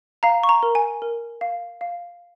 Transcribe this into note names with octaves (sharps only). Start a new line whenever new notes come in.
F5 A#5
C#6
A#5
A#4
G#5
A#4
F5
F5